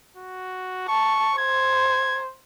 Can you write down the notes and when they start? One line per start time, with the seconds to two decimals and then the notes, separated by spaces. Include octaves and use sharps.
0.17 F#4
0.89 A5 C#6
1.38 C5 G#6